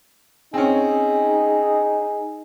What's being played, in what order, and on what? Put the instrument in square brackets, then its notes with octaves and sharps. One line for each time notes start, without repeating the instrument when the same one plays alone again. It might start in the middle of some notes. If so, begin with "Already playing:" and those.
[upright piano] C4 C#4 [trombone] D#4 [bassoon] G#4